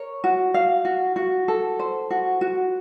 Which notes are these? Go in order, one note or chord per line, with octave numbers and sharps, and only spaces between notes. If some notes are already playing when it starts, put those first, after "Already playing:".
Already playing: A#4 C#5
F#4
F5
F#4
F#4
A4
C5
F#4
F#4